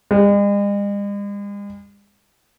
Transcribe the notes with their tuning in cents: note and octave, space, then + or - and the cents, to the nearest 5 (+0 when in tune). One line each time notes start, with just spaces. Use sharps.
G#3 -45